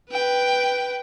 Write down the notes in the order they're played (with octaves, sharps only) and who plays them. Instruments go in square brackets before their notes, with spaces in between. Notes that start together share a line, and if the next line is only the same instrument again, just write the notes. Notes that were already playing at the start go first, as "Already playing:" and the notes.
[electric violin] B4 G5